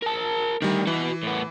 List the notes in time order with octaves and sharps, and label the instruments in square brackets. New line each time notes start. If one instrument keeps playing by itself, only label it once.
[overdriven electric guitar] A#4 A5
[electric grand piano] D#3 G3 [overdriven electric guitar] A3 D4
[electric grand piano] E3 [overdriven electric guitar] F#4 B4
[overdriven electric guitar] A2 B3